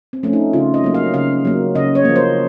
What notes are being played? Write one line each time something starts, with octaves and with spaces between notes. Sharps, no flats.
C4
F3 A3 C#4
D#4
C#3 F4
D#5
F#3 A#3
F5
C#3 F5
F#3 A#3
C#3 D#5
C#5
F3 A#3
C5